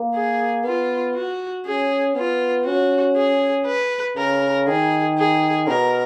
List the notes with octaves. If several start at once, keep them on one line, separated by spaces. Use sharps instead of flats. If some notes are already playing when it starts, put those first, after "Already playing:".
Already playing: A#3
G#4
B3 F4
F#4
C#4 G#4
B3 F4
C#4 F#4
G#4
B4
C#3 A#4
D#3 G#4
G#4
B2 A#4